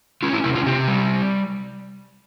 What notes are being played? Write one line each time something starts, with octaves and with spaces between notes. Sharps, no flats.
C#4 F4
E4
C3 E4
F4
C3 G4
G3